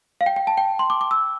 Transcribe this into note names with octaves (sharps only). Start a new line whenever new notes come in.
F5
G5
G5
A5
G5
C6
D6
D6
E6